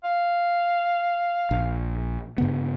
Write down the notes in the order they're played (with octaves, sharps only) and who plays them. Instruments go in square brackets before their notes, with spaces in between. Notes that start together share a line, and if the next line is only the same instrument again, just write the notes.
[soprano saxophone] F5
[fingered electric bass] A#1
G2 C#3 B3